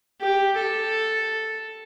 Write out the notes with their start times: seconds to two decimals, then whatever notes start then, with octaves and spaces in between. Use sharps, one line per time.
0.21 G4
0.57 A4